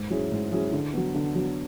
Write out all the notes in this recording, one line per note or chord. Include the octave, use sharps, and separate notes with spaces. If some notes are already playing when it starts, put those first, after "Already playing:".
Already playing: G#2
F#3 C#4 E4 G#4
G#2
F#3 C#4 E4 G#4
D3
F#3 B3
D3
F#3 B3